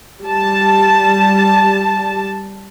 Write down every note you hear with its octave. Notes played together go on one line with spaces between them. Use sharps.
G3 A5